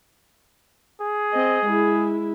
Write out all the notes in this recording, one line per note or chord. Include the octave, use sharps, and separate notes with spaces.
G#4
C4 D#5
G#3 E4